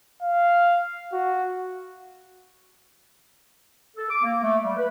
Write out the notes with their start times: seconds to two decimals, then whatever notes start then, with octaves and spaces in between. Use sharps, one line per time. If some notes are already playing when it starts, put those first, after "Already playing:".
0.22 F5
1.13 F#4
3.97 A4
4.10 D6
4.22 A#3
4.43 A3
4.64 G3
4.77 B4